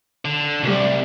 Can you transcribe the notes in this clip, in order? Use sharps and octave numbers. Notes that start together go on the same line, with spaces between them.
D3
C2 G3